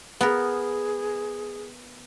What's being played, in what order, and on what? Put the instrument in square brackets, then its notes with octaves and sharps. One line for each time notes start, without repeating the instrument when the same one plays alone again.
[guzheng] B3 A#4 [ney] G#4